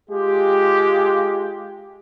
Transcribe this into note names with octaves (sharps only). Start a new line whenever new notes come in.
G#3 F4 G4